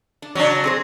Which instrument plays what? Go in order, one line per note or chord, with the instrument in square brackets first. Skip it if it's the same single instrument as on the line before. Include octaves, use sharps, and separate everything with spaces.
[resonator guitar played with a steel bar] D4
[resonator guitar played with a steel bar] C#3 C#4 [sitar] F#3 D4
[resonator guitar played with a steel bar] C4 G#4 C5